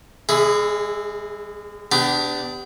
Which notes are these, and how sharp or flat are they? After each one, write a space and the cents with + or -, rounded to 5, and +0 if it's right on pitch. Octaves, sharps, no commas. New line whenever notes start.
G#3 -35 E4 -5 G#4 +15
B3 +35 D4 +0 G4 +0